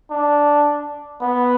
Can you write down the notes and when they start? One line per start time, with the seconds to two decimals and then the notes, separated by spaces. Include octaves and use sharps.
0.11 D4
1.22 B3